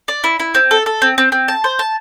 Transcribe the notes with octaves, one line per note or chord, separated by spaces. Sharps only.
D5
E4
E4
C4
A4
A4
C4
C4
C4
A5
C5
A5